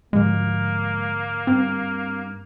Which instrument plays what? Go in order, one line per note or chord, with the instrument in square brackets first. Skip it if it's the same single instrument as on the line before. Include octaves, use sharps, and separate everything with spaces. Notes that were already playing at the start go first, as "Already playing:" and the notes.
[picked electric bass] D2 G#2 F3 [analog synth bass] G#3 [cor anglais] A#3
[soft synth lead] G2 [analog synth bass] C4